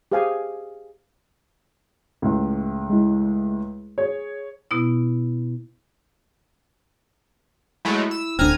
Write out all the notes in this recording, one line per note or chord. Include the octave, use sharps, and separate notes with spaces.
G4 G#4 C5 F5 G5 G#5
C#2 A2
G#3 E4
G#4 C#5
B2 B3 E4
F#3 G#3 A3 E4
E6
D1 D3 C4 D4 G#5 A#5 F6 G#6